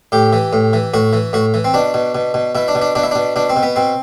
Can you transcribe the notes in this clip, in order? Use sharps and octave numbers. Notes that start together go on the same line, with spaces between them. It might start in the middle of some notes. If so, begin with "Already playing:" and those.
A2 G4
E3
A2
E3
A2 F#4
E3
A2 F#4
E3
C4
B2 D4
B2
B2
B2
B2 E4
D4
B2
D4
B2 D4
E4
B2 D4
B2 D4
C4
B2
B3
B2 C4